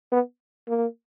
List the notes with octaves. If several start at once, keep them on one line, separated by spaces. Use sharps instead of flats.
B3
A#3